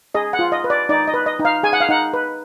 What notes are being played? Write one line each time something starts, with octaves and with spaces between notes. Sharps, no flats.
G#4 D#5
F#5
F4
D#5
B4
D5
D#4 D5
D#5
B4
D#5
D#4
F5
G#4 G#5
F#5
F5
D#4 F#5
B4